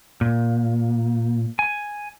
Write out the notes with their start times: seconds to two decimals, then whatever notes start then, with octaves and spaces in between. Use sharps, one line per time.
0.21 A#2
1.59 G#5